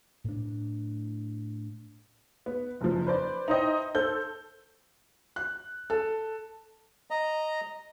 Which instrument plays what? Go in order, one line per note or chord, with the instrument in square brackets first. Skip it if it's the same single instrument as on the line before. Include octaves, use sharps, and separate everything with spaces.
[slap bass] A2 D4
[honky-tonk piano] B3
F#1 F3
B4 C5 D5
D#4 E4 C5 D#5 G5
A4 C5 G6
[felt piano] F#6
A4
[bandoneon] D#5 A#5